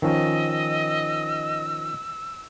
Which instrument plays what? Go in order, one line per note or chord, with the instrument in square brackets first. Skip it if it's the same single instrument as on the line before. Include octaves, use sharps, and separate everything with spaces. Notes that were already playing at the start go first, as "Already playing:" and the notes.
[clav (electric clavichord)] D#3 F3 C#4 [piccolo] D#5 [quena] E6